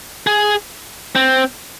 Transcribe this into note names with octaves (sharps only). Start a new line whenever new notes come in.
G#4
C4